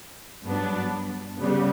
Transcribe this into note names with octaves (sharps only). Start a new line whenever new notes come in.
G2 F#3 B3 D4
C#3 G3 B3